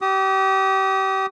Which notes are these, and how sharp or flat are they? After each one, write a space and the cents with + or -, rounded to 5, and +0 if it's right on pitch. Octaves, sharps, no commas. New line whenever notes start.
G4 -30 D#6 +0